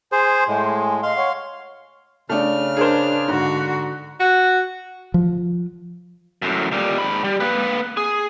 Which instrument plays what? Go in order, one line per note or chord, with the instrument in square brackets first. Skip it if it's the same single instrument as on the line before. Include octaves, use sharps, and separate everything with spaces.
[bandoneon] G#4 C5 [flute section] G#5 C6
[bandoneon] A2 G#3
[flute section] D#5 [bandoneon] F5 C6
[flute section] C#5 F#5 C#6
[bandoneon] C#3 F6 [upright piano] A3 D4
[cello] D4 [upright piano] G#4 A#4 C5
[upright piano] G#2 [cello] D3 F#4
[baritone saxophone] F#4
[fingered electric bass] F3
[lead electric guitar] F#2 A2
A#2 G3
G#2 B5
G3
A#3 B4
G#4